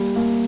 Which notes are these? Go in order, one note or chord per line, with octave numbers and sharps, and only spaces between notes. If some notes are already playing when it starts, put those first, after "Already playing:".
Already playing: G3 A#3
A#3